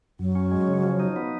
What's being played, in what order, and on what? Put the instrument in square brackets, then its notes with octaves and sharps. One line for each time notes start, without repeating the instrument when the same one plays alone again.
[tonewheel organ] F#2 [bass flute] F#3
[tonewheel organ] C#4
G#3
C#3
F3
D#4
B3